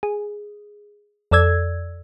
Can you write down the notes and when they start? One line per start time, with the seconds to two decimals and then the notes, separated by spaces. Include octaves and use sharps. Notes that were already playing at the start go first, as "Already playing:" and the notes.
0.03 G#4
1.31 F2 A4 D5 E6 G#6